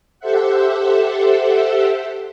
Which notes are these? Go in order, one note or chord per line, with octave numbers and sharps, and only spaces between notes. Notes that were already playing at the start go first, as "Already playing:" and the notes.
G4 A4 C5 E5 F#5